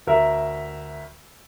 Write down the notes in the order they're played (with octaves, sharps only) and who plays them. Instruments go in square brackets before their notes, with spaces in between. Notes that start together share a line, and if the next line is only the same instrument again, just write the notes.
[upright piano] D2 A#4 E5